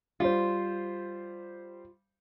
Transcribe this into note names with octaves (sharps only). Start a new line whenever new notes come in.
G3 F4 C5